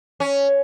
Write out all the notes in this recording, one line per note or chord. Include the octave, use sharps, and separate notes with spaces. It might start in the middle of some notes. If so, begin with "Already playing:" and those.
C#4